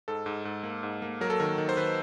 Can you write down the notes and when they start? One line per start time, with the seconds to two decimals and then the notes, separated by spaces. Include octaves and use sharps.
0.08 G#2 A4
0.26 G#2
0.45 G#2
0.63 A#3
0.83 G#2
1.02 A#3
1.21 F#3 A#4
1.30 A4
1.40 D#3 A#4
1.58 D#3
1.69 C5
1.77 D#3 B4